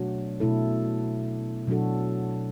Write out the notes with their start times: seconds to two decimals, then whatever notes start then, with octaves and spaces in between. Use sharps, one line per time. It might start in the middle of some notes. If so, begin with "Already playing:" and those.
Already playing: B2 F#3 A3 D4 F#4
0.40 B2 A3 E4 A4
1.67 B2 F#3 D4 F#4 A4